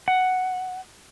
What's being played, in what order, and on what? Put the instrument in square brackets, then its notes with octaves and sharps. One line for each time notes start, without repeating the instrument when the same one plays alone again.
[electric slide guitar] F#5